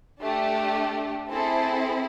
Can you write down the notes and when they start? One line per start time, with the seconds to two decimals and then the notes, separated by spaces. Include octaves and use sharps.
0.21 A3 D4 G4
1.31 C4 E4 G#4 A4